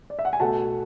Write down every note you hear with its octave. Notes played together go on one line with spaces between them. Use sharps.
D5
E5
F#5
G#5
B2 A3 F#5 A5